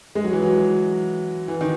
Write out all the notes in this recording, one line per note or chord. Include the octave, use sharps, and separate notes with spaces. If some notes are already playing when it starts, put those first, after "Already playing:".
G#3
F#3
E3
F#3
E3
D#3